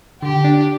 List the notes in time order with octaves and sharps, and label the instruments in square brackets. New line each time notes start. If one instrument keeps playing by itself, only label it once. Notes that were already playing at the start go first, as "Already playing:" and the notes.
[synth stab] D3 [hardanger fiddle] G4
[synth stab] D4